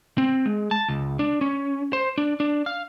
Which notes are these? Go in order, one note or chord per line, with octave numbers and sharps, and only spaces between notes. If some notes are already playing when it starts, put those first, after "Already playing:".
C4
G#3
A5
C#2
D4
C#4
C5
D4
D4
F5